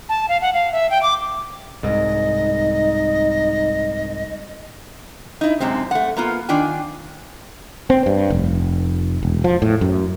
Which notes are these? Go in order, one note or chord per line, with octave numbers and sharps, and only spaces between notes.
A5
F5
F#5
F5
E5
G5
D6
C2 G#2 D#4 D#5
D#4 E4
F#2 C3 G#3 C4
A3 F#5
A#3 B3 F4
D#3 D4 F4 G5 G#5
C4
G2
F1
E1
F3
A2
F#2